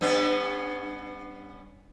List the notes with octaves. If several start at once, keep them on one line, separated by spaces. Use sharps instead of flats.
G2 B3 C#4